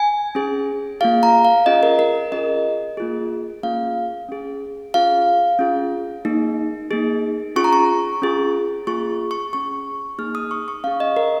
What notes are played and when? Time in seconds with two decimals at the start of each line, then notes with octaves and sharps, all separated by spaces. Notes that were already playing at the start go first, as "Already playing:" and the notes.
Already playing: G#5
0.35 C#4 G#4
1.00 A#3 F4 G#4 F5
1.23 A#5
1.45 F5
1.66 C#4 F4 G#4 D#5
1.83 A#4
1.99 A#4
2.32 C#4 F4 G#4 D#5
2.97 A#3 F4 G#4
3.63 A#3 C#4 F4 G#4 F5
4.28 C#4 G#4
4.94 C#4 F4 G#4 F5
5.59 C#4 F4 G#4
6.25 A#3 D#4 G#4
6.91 A#3 D#4 G#4
7.56 C#4 F4 G#4 C#6
7.64 A#5
7.73 C#6
8.22 C#4 F4 G#4
8.87 A#3 F4 G#4 C#6
9.31 C#6
9.53 C#4 G#4 C#6
10.18 A#3 D#4 G#4 F6
10.35 D#6
10.51 C#6
10.68 C#6
10.84 C#4 F5
10.87 G#4
11.00 D#5
11.17 A#4